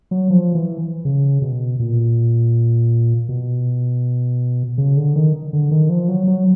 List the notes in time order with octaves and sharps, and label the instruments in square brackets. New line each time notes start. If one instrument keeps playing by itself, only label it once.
[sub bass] F#3
F3
E3
C#3
B2
A#2
B2
C#3
D3
D#3
D3
D#3
F3
F#3
F#3